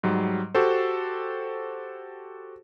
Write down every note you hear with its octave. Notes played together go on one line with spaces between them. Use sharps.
G#2 F#3 G3
F#4 G4 A4 C5